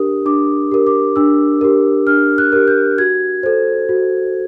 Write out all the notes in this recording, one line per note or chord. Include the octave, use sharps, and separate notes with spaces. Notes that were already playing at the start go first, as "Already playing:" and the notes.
Already playing: D4 G4 A#4 D#6
D4 D6
G4 A#4
D6
D4 E6
G4 A#4
D4 F6
F#6
G4 A#4
G6
F#4 G#6
A4 C5
F#4